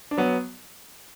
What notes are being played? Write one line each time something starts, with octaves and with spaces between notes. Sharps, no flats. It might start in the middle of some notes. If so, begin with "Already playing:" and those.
D4
F#3 B3